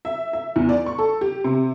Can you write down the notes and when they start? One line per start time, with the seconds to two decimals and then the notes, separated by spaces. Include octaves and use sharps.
0.05 E5
0.33 E5
0.56 E2
0.69 D5
0.86 C#6
0.98 A4
1.21 G4
1.44 C3